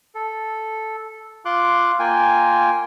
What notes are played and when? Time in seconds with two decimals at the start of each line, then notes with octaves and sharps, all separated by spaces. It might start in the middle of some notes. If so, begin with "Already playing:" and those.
0.15 A4
1.45 F4 C6 D6 F#6
1.99 A#3 F4 G5 G#5